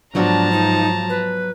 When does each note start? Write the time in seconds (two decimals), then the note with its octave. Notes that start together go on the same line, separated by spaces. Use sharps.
0.15 G#2 F3 F#3 B3 D4 F#4 A5 A#5
0.52 D#4
1.09 B4